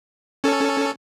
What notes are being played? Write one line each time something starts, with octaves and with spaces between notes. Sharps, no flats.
C#4 A4